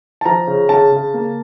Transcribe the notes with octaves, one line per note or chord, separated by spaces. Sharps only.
A5
F3 A#5
C#3
C#3 A5
C#3
A#3